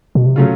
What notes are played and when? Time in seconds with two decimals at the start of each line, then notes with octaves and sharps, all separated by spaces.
0.15 B2
0.26 C3
0.36 C#3 F#3 A3 C#4 F4